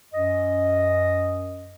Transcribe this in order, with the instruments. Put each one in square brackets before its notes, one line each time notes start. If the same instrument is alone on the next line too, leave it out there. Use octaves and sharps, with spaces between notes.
[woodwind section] F#2 D#5